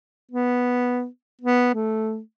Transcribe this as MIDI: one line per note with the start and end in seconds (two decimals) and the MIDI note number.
0.31 1.07 59
1.41 1.74 59
1.75 2.20 57